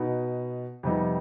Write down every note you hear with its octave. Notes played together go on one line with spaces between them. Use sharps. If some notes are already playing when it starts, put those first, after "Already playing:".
Already playing: B2 B3 D#4
F2 C3 G3 B3 D#4